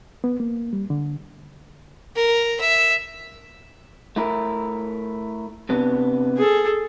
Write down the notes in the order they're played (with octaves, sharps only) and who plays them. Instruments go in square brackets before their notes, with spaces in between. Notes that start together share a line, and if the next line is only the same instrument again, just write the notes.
[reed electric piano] B3
A#3
G3
D3
[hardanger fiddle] A#4
E5
[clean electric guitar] A3 E4 A#4
C3 B3 D4
[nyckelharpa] G#4 A4